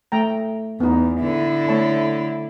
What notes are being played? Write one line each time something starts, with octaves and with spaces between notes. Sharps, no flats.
A3 G5 A#5
E2 B3 D#4
D3 E4
A3 C#5 A5